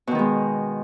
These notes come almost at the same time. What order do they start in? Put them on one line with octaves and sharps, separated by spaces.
B2 D#3 B3 G#3